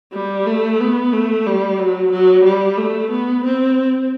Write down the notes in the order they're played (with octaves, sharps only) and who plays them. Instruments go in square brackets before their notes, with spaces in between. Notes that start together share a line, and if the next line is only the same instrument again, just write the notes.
[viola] G3
A3
B3
A3
G3
F#3
F#3
G3
A3
B3
C4